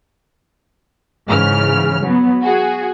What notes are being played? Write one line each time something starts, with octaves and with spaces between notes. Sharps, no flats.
G#2 C#3 E3 F6
F#3 B3
F#4 G#4